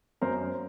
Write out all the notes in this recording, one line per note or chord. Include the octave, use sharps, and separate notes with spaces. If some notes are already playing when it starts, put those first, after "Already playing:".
F#2 A#4 C5